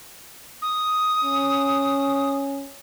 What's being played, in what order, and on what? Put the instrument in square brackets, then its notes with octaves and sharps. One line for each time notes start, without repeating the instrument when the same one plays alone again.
[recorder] D#6
[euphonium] C#4